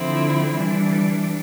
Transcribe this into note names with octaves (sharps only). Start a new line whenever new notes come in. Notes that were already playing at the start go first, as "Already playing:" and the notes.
Already playing: D3 F3 C4 E4
E3 G3 D4